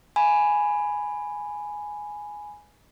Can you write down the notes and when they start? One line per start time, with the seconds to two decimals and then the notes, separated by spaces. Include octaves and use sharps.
0.16 G#5 B5